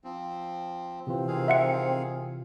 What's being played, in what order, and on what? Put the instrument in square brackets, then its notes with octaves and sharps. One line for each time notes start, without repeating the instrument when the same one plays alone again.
[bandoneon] F3 C4
[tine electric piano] C3 E3 F4 [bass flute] C4
[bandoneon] D#3 G#4 F5
[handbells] E5 F#5 C#7